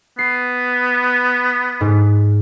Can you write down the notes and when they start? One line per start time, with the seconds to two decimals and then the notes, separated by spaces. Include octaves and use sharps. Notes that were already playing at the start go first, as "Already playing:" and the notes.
0.19 B3 C7
1.81 G#2